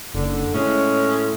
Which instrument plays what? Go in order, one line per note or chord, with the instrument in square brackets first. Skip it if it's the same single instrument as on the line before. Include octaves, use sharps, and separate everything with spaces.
[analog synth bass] F#1 [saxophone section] D3
[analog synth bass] A2 [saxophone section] G#3 C#4